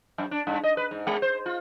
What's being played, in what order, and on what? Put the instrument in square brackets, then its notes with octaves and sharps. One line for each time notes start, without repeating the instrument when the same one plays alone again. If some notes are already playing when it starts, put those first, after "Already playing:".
[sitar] F#2
D4
G2
D#5
B4
G#2
G#3
C5
F4